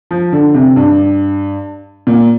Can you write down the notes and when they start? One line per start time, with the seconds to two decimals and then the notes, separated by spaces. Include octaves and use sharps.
0.11 F3
0.33 D3
0.54 C3
0.76 G2
2.07 A#2